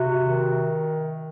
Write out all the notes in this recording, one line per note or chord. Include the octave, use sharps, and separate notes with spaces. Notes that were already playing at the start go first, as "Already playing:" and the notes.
Already playing: C3 F#4
D#3